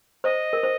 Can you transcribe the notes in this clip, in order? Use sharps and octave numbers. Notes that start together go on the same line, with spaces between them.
C5 D#5
A#4
C5